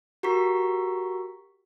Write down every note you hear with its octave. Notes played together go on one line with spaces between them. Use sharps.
F#4 G4 A#4 A#5 C#6 B6